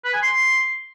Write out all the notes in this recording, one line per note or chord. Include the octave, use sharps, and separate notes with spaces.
B4
G#5
C6